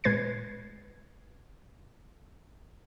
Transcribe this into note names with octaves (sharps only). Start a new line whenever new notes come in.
A#2 G#3 B4 G#6 A6 C7